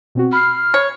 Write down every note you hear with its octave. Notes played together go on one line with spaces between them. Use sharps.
B2 C4 F#4
B5 F6 C7
C#5